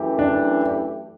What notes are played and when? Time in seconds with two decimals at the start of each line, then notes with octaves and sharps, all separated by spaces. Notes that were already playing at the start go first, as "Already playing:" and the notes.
Already playing: F#2 E3 A3 E4 G4
0.19 D4